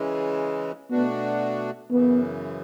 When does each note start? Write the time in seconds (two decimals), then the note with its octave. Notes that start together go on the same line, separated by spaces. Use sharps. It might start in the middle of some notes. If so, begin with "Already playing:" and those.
Already playing: C#3 E3 G#3
0.91 B2 A3 B3 D4 F#4
1.91 F#2 C#3 E3 B3